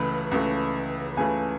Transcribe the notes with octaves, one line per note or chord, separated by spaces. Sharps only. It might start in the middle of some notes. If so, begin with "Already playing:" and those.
Already playing: C#2 C#3 E3 A3 B5
C#2 C#3 E3 A3
C#2 C#3 E3 A3 G#5